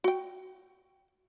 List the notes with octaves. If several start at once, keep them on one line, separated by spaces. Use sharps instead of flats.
F#4 G5